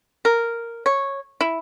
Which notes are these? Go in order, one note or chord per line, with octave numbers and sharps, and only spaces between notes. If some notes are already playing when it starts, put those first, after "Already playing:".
A#4
C#5
E4